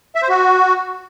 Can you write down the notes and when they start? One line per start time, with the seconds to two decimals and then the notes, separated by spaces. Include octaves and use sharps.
0.15 E5
0.22 C5
0.29 F#4